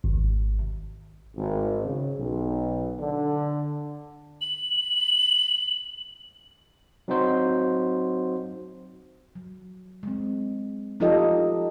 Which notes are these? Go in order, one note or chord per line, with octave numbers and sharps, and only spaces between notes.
G#1
G#1
C#3
B1
D3
F#7
F#3 C4 D#4 F#4 C5
F#3
G#3 C4
F3 D#4 F4 G4 A4 D#5